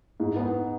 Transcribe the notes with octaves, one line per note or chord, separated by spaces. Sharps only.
G#2
B3